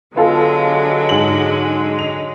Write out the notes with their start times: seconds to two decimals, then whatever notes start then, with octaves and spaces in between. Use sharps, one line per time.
0.16 D3 F#3 G#3 B3 F4 A4
1.09 G#2 G#5 F#7
1.99 F7